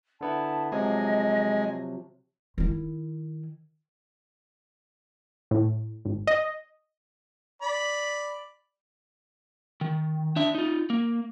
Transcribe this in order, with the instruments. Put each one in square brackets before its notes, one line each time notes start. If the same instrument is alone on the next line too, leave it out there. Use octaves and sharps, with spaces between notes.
[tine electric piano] D3 B3 E4 [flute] A5
[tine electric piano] C3 F3 F#3 [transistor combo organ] G#3 [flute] D#5
[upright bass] D#3 E4
[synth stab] A2
G#1
D#5
[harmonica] D5 B5
[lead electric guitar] D#3
D4 E5
D#4 F4
A#3